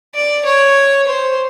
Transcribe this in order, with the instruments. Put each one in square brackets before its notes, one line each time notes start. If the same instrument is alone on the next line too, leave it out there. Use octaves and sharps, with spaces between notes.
[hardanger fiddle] D5
C#5
C5